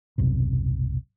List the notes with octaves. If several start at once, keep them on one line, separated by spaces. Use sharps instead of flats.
D#1 B1 F#2 C3